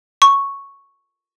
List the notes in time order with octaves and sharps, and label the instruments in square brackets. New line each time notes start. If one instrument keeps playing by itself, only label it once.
[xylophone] C#6